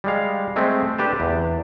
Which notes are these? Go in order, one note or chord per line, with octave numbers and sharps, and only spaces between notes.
G3 G#3 F5
G#3 A3 C4
D4 G4 B4 A5
E2